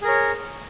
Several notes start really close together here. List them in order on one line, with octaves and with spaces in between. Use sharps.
G#4 A#4 C#5